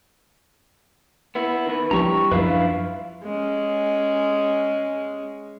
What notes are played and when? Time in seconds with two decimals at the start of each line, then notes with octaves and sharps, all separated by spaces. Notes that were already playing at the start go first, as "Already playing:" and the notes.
1.35 B3 E4
1.67 D#3 B4
1.91 E3 F3 G3 D4 G4 A#5 C#6
2.32 F#2 F3 D4 E4 F4 B4 F5
3.23 G#3 C#4